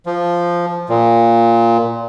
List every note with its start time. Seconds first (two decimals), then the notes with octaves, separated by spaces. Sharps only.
0.06 F3
0.89 A#2